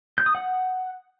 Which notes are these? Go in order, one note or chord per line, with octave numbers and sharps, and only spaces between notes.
G6
D#6
F#5